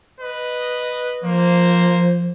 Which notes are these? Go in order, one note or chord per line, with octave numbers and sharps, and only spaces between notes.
B4 D#5
F3 A#3 C5